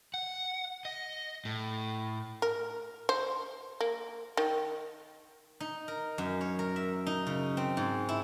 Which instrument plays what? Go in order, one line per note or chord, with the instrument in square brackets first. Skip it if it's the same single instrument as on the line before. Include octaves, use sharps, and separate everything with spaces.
[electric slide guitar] F#5
D#5
A2
[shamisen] A#4
C5
A#3
D#3
[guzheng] D#4
A#4
F#2
C#5
A#4
E5
D#4
C#3
C4
G#2
E4